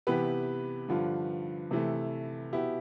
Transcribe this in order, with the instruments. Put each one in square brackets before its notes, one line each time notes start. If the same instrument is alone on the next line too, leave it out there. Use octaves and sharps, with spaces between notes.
[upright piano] C3 E3 B3 G4 B4
G2 D3 F3
C3 E3 A3
B2 B3 E4 G4